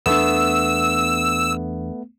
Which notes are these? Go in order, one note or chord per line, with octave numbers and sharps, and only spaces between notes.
E2 A3 B3 D4 E6